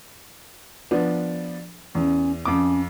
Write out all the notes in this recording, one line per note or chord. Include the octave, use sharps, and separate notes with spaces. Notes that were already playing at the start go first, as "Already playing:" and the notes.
F3 B3 D4
E2 C#4
F2 C#4 D6